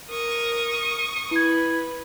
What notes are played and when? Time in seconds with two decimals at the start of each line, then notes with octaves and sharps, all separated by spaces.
0.11 A#4 C#6 D#6
1.31 E4 B4 G#6